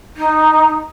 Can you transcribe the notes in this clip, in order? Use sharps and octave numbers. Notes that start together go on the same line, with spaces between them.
D#4